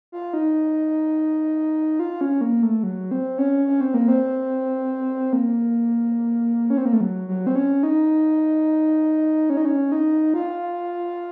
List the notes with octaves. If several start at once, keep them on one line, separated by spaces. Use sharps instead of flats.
F4
D#4
F4
C#4
A#3
A3
F#3
C4
C#4
C#4
C4
A#3
C4
A#3
C#4
C4
A#3
A3
F#3
F#3
C4
C#4
D#4
C#4
D#4
C#4
D#4
F4